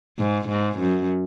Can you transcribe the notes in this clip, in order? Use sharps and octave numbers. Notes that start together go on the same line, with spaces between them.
G#2
G#2
F#2